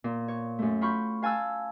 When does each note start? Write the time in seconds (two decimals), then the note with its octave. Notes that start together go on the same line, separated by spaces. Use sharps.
0.04 A#2
0.28 C#5
0.59 F#2 A3
0.81 F4 B5 C#6 G6
1.23 F5 G#5 A5 E6 F#6